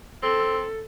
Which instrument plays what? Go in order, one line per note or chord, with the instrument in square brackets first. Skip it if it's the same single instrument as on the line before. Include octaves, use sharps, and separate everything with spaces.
[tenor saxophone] C4 [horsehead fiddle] A4